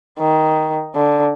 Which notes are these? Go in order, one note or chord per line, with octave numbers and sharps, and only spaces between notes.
D#3
D3